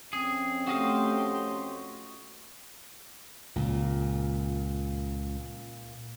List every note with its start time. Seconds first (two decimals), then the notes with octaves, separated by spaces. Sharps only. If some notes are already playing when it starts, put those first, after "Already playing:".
0.13 F2 C4 C#4 G#4
0.67 A3 F#4 G4 D#5 F5 C6
3.56 C#2 A#2